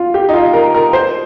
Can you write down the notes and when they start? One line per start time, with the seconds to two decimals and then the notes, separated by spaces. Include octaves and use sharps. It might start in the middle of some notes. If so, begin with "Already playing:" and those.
Already playing: F4
0.14 G4
0.29 D#4
0.34 F4
0.53 A#4
0.74 A#4
0.93 C5